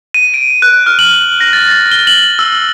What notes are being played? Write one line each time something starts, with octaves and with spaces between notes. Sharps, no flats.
D#7
D7
F#6
F6
F#7
A#6
A6
G7
F#7
E6